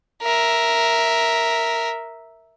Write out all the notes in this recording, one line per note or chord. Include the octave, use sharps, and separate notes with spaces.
A#4 E5